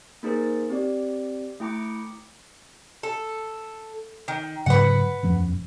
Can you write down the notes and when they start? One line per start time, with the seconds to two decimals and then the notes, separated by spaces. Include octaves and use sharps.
0.23 A#3 D#4 G#4 A#4 C5
0.70 C4 G4 D5
1.60 A3 E4 G5 A#5 D6 C#7
3.03 A4
4.28 D#3
4.66 G#2 C#3 F#3 B4 F#5
5.23 E1 F#2 F3